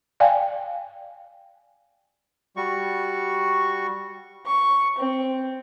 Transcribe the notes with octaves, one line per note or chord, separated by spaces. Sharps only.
D5 F5 G5 G#5
G3 F#4 C#6
C#6
C4